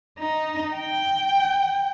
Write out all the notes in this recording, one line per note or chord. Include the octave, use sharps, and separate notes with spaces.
D#4
G5